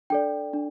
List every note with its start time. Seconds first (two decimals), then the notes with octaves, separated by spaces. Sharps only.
0.10 D4 A4 D5 G5
0.53 D4